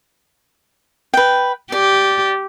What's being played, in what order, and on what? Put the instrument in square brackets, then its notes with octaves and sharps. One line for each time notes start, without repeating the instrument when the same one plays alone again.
[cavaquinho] B4 G5
[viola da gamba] G4 [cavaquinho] D5